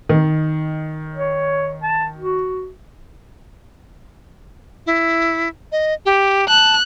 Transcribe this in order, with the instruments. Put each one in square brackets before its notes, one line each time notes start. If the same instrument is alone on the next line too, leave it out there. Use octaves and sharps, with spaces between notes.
[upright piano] D#3
[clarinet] C#5
A5
F#4
[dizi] E4
D#5
G4
[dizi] A5 [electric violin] F#6